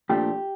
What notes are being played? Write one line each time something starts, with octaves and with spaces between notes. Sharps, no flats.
A#2 F3 A3 D4 G4